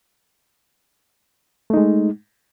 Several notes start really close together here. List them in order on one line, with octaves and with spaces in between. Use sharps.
A3 D#4 G#3